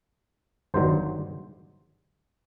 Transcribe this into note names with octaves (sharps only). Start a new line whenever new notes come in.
G1 G2 D#3 F#3 C5